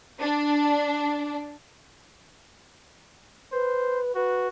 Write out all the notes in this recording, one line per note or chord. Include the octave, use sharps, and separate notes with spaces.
D4
B4 C5
F#4 B4